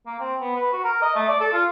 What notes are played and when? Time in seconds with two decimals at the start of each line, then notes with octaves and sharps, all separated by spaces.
0.06 A#3
0.19 C4
0.40 B3
0.56 B4
0.73 F#4
0.84 A#4
1.02 D#5
1.15 A3
1.28 D5
1.40 A4
1.53 F4